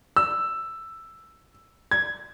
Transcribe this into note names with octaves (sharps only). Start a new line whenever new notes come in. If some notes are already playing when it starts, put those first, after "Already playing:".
E6
G#6